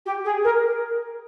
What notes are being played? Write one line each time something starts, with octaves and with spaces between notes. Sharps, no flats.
G4
G#4
A#4